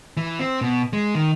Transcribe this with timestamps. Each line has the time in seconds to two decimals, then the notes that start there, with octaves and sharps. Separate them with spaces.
0.17 E3
0.39 C4
0.61 B2
0.93 G#3
1.15 D#3